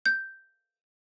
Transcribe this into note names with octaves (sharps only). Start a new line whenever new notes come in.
G6